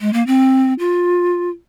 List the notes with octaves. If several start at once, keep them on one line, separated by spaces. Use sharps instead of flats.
G#3
A#3
C4
F4